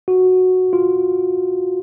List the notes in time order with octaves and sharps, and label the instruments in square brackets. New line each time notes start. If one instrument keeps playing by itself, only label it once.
[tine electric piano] F#4
F4